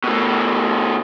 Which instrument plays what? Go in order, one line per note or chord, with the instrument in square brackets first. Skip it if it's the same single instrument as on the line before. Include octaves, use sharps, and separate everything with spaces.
[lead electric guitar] B2 A3